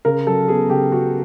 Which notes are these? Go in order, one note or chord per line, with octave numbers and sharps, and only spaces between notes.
C#3 A#4
F#3 A4
B3 G#4
C#3 G4
C#3 F#4